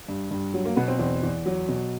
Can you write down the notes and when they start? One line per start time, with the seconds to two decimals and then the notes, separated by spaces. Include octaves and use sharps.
0.08 G2
0.31 G2
0.54 F#3
0.65 A#3
0.76 B2 B3
0.88 C4
0.99 E2 C4
1.23 E2
1.46 F#3
1.69 B2